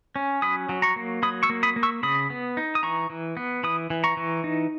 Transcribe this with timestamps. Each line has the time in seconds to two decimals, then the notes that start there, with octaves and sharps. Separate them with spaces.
0.16 C#4
0.42 F#3 B5 D#6
0.69 F#3
0.82 A#5 C#6
0.96 A#3
1.23 F#3 B5 D#6
1.43 C#6 E6
1.50 A#3
1.63 B5 D#6
1.76 A#3
1.83 C#6 E6
2.03 C#3 B5 D#6
2.30 B3
2.57 D#4
2.75 D#6
2.83 E3 A#5 C#6
3.10 E3
3.37 B3
3.63 E3 B5 D#6
3.90 E3
4.04 A#5 C#6
4.17 E3
4.44 D#4